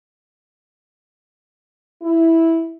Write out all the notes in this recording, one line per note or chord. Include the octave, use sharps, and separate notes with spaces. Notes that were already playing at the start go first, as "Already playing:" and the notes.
E4